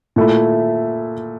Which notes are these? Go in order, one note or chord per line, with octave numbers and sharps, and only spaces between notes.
A#2 A3 E4